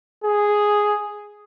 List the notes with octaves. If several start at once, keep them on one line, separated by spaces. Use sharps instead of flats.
G#4